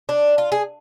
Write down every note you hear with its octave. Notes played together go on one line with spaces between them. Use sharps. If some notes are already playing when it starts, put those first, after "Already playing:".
D4
F4
G#4